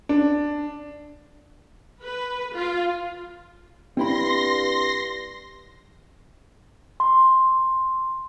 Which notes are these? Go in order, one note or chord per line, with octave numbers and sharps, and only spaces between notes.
D4
B4
F4
G2 C4 E4 B5 C6 A#6
C6